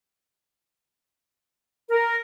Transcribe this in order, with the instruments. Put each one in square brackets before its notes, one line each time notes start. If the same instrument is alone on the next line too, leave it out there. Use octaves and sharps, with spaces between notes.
[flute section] A#4